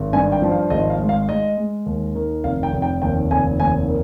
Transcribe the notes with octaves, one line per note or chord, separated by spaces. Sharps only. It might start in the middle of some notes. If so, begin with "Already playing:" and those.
Already playing: G#1
G2 G#5
G5
F3
F5
G#1 D#5
F5
G#3
F5
G#3 D#5
G#3
D#2
D#3
F1 F5
G5
F1
G5
D#2 G5
F1 G#5
D#2 G#5
D#3